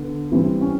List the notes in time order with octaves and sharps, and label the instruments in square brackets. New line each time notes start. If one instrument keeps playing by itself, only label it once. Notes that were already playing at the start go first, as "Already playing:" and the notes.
Already playing: [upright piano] D3 B3
E3 G3 C4
C#4